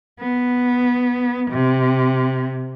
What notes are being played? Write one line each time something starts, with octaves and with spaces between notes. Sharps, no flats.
B3
C3